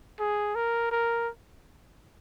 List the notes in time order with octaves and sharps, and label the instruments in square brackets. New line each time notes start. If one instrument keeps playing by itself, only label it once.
[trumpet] G#4
A#4
A#4